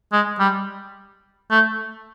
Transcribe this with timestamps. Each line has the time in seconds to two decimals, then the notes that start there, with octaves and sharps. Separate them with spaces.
0.12 G#3
0.39 G3
1.51 A3